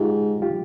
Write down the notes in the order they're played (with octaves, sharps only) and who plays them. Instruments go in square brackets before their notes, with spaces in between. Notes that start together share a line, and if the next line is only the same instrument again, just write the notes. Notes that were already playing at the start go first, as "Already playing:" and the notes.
Already playing: [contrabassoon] G#2 [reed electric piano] F4 G4
[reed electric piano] F4 G4